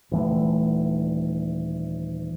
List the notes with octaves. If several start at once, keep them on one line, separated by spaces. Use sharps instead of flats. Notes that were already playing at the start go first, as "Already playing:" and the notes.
D#1 E3 A3